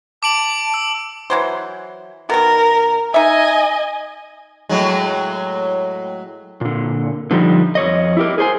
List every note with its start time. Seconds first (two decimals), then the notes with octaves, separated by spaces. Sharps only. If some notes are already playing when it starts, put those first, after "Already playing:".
0.23 A5 D6 D7 F#7
0.74 E6
1.30 E3 F#3 C5
2.30 B2 D#3 A#4
3.14 D#4 D#5 E5 G#5
4.69 A2 F#3 G#3
6.61 A#2 D3
7.31 D3 F3 G3 D#4
7.75 F2 C#5 D#5
8.17 E4 G4 A#4
8.38 G#4 C5 G#5